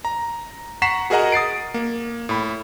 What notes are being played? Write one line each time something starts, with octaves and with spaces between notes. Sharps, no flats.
A#5
F#5 A#5 C#6 B6 C7 E7
F#4 G#4 A#4 D#5 F#5 A#5
D#6 A6 C7 D7
A#3
A2 B5